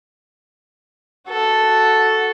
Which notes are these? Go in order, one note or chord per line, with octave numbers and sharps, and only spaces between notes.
F#4 A4